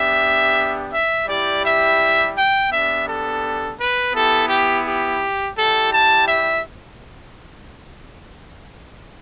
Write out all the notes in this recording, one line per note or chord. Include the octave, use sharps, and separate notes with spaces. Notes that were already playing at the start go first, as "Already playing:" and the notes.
Already playing: B3 D4 G4 E5
E5
G3 E4 G4 D5
E5
G5
B3 D4 G4 E5
A4
B4
B3 E4 G4 A4
G4
G4
G3 E4 G4 A4
A5
E5